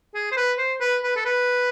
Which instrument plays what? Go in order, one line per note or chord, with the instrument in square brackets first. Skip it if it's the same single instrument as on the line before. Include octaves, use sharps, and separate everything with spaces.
[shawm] G#4
C5
B4
C5
B4
B4
A4
B4